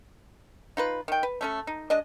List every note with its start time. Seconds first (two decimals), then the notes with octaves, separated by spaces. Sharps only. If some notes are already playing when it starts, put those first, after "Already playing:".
0.77 D#4 F4 B4
1.08 D#3 G5
1.23 B4
1.41 A3 C#4 A4
1.67 D#4
1.90 G#3 D4 D#5